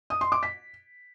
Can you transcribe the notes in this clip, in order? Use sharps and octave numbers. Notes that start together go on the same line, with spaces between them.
D#6
C6
D6
B6